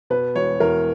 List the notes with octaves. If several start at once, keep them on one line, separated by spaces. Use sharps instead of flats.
B2 B4
E1 C#5
E2 A#4